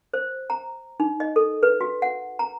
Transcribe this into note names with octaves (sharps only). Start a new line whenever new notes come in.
C5
A#5
D#4
D#5
A4
B4
F#4
F#5
A#5